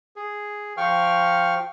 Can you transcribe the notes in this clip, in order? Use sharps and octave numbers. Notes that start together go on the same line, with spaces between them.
G#4
F3 F5 G5 C#6 F6